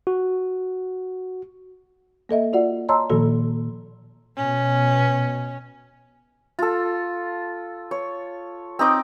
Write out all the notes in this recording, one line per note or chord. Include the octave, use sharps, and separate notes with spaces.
F#4
A#3 A4 D#5 E5
F4 F#4 D5 F#5
C#5 D#5 A5 A#5 C6 E6
A#2 D#3 F3 A#3 F#4 A4
B2 C#4
F4 A4
C#5
C4 D#4 D#5 D6